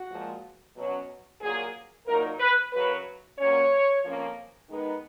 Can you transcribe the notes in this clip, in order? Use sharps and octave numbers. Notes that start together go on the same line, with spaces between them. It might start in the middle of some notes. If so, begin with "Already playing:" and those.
Already playing: F#4
A#2 F3 G#3
B2 F#3 C#4
A#2 F#3 A#3 G#4
A#2 F#3 A#3 D#4 A#4
B4
F#2 C#3 F#3 B4
A#2 F#3 A#3 C#4 C#5
F2 F3 A#3 C#4
D#3 G#3 B3 D#4